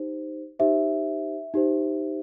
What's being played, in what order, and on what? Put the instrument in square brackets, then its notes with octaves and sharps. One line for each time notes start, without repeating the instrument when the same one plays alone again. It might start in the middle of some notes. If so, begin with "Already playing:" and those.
Already playing: [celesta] D#4 G4 C5
D#4 G4 C5 E5
D#4 G4 C5